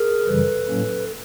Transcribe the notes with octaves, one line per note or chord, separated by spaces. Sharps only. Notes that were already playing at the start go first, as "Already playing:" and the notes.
Already playing: G#4 A#4
F#2 C#3 E3 G3 A4 B4
A2 F#3 A#3 C#4